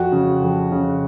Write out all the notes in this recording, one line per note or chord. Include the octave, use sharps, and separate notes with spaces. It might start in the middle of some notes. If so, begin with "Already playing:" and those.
Already playing: F2 F#4
C#3
F2
C#3